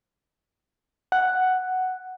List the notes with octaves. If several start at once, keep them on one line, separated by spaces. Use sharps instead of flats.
F#5